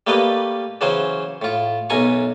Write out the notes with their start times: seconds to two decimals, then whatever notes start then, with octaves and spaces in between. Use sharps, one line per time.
0.07 G3 A3 A#3 G4 B4 D#5
0.81 C#3 E3 F#3 C#4 C5
1.42 A2 F4
1.90 B1 F#2 C#4 G#5 A#5 C#6